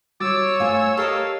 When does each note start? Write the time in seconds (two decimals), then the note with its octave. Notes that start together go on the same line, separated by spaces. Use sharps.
0.21 G3 F#4 C#5 D6 E6 A6
0.60 G2 A3 F4 C5 G#5
0.97 G4 A4 A#4 D#5 F5